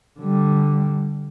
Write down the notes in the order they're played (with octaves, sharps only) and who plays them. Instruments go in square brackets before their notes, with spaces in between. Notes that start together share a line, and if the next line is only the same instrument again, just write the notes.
[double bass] D3 G3